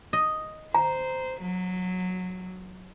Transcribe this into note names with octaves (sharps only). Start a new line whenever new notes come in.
D#5
C5 A#5
F#3